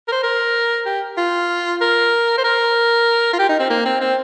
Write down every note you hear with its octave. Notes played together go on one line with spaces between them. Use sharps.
A#4
C5
A#4
G4
F4
A#4
C5
A#4
F4
G4
D#4
C4
A#3
C4
C4